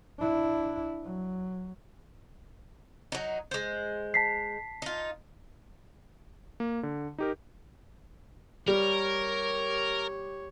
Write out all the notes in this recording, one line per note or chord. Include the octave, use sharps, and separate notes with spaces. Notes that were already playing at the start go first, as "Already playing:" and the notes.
D4 E4
F#3
F#3 D#4
G#3 C5
A5 B6 C7
D#4 F4
A#3
D3
D#4 G4 A#4
G3 G4 A#4 C#5